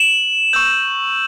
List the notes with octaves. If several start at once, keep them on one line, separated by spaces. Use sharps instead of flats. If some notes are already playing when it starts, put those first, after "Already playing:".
Already playing: E7 F#7
C#6 E6 G6